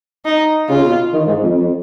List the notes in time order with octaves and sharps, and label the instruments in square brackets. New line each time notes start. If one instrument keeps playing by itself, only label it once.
[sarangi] D#4
[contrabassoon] C#3 [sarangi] F4
[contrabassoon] B2
D#3
G#2
F2
F2